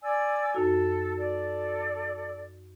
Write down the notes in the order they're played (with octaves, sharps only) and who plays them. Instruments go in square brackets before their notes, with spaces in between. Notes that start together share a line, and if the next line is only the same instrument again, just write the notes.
[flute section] D5 G#5 E6
[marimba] F#2 D#4 F#4 [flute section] A4
[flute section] A4 D5